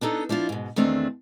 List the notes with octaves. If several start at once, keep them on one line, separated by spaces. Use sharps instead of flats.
B3 D4 D#4 A4
F3 D4 E4 F4
G#2 B2
E2 D#3 A3 C4 D4